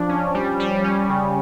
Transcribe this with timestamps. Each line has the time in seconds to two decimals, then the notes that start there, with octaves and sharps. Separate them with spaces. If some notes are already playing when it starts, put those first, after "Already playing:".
Already playing: F3 D4
0.09 C#4
0.35 G3
0.60 G3
0.84 C#4
1.09 C#3